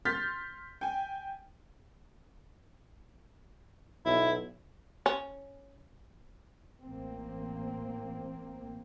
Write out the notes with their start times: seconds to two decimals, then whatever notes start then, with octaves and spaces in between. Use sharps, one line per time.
0.05 C6 F6 G6 A6 B6
0.81 G5 G#5
4.06 B1 E4
5.06 C#4
6.83 A1 A#3 C4